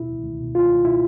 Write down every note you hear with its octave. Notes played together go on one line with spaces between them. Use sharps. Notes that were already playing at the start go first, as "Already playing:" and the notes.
Already playing: D#2 B2 E4
C#2
C#2
B2
C#2 F4
C#2
B2 E4